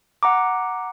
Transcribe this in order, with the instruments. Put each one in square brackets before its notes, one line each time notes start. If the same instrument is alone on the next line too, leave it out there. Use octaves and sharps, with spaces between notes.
[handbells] F#5 A#5 D6